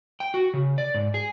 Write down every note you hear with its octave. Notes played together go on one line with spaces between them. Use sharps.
G5
F#4
C#3
D5
G#2
G#4